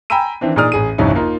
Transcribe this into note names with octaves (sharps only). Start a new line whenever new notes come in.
G5 G#5 A#5 B5 E6 D#7
D#3 E3 C4 D4
A#2 D#4 G#4 D5 D#6 F6
A1 G#4 D#7
G1 C2 F2 C#4 D#4 E4
A#3 D#4 F4